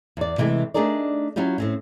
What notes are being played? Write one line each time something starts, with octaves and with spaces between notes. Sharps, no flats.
E2 D5
C3 E3 G#3 A3
A3 D4 D#4 G#4 A#4 D5
F#3 C#4 E4 F4 G4
A2 C4 C#4